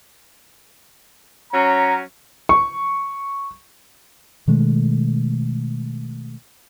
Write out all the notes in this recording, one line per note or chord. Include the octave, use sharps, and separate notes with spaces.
F#3 C#4 A#5
C#6
B2 D#3 G#3 A3